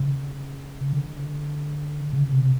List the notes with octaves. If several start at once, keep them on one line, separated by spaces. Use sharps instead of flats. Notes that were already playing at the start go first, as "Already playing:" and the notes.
Already playing: C#3
D3
C#3
C3